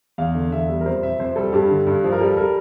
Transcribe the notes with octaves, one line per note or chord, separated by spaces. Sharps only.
E2 F5
D3
E2 E5
G3
A#4
F2 C5
C3 E5
F2 C5
G3 A4
G2 G4
D3
G2
F3
A#4
G3 A4
G3 A#4